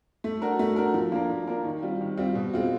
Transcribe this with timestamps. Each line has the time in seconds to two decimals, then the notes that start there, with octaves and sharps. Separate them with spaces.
0.24 A3
0.42 D4 F#4 A#4
0.59 A3
0.76 D4 F#4 A#4
0.94 F3
1.12 A#3 D4 F4 A#4
1.30 F3
1.47 A#3 D4 F4 A#4
1.64 D#3
1.83 G3 C4 F4
2.01 D#3
2.17 G3 C4 F4
2.35 B2
2.54 G#3 C4 F4